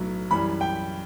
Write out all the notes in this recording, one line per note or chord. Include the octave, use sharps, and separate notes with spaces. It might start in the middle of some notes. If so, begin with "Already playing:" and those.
Already playing: B1 A2 F#3 B3
F#2 E3 G3 B5
G5